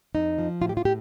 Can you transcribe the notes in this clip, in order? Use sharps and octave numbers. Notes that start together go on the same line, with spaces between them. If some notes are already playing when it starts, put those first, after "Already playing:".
F2 D#4
F3
A2 F4
G4
F4
A2 G4